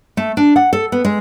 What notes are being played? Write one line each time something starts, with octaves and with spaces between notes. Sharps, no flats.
A3
D4
F#5
A4
B3
G#3